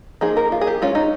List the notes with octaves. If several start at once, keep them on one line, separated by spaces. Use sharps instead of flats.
F3 A#3 D#4 G#4
A#4
F4
G#4
G4
G#3 C#4 F4
D#4